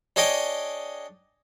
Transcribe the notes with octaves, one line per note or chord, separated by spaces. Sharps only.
D4 G#4 C#5 D#5 G5